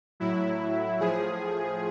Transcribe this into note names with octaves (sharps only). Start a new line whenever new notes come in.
A2 F#3 E4
A2 F3 G#4